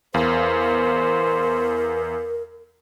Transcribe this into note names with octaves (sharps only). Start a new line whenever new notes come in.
E2 A#4 C5 F5